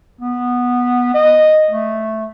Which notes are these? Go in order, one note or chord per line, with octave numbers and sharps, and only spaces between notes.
B3
D#5
A3